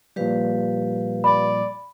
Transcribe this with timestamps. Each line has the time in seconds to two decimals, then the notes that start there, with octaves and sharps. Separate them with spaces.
0.16 A#2 F3 G3 G4 B4 F5
1.24 D5 B5